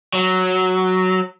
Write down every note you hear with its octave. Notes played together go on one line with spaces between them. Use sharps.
F#3